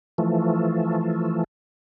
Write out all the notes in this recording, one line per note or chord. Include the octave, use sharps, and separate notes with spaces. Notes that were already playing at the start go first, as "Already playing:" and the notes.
E3 F3 A3